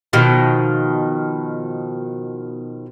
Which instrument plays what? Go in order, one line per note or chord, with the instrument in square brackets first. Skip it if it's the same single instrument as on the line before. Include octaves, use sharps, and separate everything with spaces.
[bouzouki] B2 D#3 F3